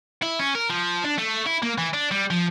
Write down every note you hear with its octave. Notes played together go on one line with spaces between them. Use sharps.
E4
C#4
A#4
F3
D4
A3
E4
A#3
E3
D4
G3
F3